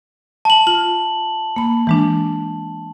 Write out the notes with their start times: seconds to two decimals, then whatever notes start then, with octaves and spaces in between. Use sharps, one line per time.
0.45 A5 F#7
0.67 F4 F#7
1.56 A#3 B5
1.87 E3 G#3 D4